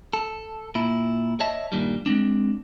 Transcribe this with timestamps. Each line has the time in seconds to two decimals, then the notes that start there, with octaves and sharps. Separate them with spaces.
0.13 A4
0.75 A#2 E4
1.40 C#5 D#5 E5 A5
1.72 G2 A#2 D#3 G3
2.06 G#3 A#3 C4 D4